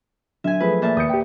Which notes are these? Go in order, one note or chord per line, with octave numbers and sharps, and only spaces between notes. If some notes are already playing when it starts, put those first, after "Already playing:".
D3 F#3 E5 G#5
F3 A3 G#4 B4
A#2 E5 A5
D#2 D#6 G6 C#7
G4 G5